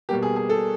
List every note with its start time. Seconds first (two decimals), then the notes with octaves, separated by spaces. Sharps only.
0.09 B2 G3 A#3 G4
0.23 G#4
0.36 G#4
0.49 A4